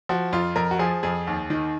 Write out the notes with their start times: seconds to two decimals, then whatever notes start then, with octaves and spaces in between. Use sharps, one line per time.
0.09 F3 F#4
0.32 F2 F4
0.56 F2 A#4
0.71 F#4
0.79 F3 G#4
1.03 F2 G#4
1.27 D#2
1.50 D#3